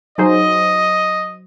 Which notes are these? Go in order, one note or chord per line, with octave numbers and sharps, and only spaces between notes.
F#3 D#4 G#4 C5 D#5